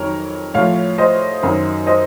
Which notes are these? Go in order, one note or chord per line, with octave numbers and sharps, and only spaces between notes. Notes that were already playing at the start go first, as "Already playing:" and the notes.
Already playing: F2 D#3 F#3 A#4 C#5
A2 F3 C#5 F5
C5 D#5
F#2 D#3 F#3
C5 D#5